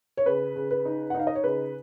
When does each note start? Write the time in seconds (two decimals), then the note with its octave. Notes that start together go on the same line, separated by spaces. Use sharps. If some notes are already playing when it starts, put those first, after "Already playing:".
0.17 C#5
0.26 C#3 B4
0.56 C#3
0.71 B4
0.85 D#4
1.10 F#5
1.15 D#4
1.20 F5
1.27 D#5
1.35 C#5
1.44 C#3 B4